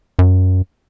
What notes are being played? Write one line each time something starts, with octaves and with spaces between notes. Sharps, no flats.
F#2